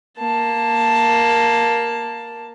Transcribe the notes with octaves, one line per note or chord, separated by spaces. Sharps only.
A#3 A5